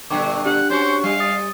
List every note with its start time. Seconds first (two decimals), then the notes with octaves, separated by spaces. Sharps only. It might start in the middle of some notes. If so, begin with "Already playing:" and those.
0.10 G2 A#2 D3 G5 C#6 D6
0.45 D4 G4 F#5
0.70 C#4 F#4 C5
1.04 G3 F5
1.20 D#6 A6